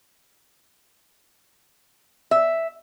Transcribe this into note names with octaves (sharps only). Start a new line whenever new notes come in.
E5